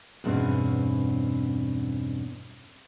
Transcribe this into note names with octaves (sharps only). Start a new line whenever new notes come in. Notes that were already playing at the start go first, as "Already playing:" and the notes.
E2 G2 B2 C4 C#4